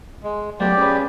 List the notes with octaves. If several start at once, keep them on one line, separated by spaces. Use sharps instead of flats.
G#3
F#3 A3 B3 G4 D5
C#4 G#4 B4